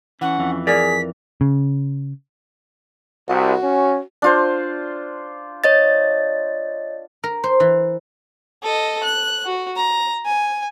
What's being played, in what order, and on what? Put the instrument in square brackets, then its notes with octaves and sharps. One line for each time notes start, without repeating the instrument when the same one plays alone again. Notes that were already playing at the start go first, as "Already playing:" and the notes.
[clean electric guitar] E3 [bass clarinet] C#4 [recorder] F#5
[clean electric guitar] F2 E3
[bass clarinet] G#4 [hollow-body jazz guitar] A#4 D5 [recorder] B6
[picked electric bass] C#3
[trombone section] C2 [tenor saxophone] F#4
[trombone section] C#4
[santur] D4 F4 C5
[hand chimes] C#5 D#5 A6
[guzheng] A#4
C5
E3
[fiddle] A4 D#5
F#6
F#4
A#5
G#5